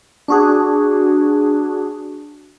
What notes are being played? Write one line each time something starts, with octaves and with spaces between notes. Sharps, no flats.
D4 F#4 G#4